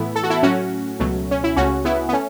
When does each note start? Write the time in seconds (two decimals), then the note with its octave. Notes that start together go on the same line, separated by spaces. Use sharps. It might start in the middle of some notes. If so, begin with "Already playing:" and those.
Already playing: A2 E3 A3 B3 E4
0.16 A4
0.23 F#4
0.30 E4 A4
0.43 A2 F#3 A3 C#4 F#4
1.00 C#2 B2 F#3 A3
1.31 C#4
1.44 E4
1.56 C#2 C#3 A3 C#4 F#4
1.85 B3 E4
2.09 B3
2.13 A3 C#4